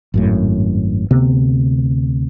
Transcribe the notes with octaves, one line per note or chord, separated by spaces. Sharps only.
G#1 F#2 A2
D2 C3 B3